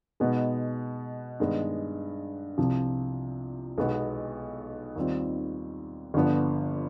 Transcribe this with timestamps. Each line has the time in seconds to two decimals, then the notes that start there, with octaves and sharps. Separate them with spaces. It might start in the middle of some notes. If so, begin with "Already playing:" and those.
0.20 B2 G#3 B3 D#4
1.40 G2 D#3 G#3 B3
2.58 C2 C3 F3
3.78 B1 B2 G#3 B3
4.96 D#2 D#3 G3 C4 F4
6.14 G1 G2 D3 F3 B3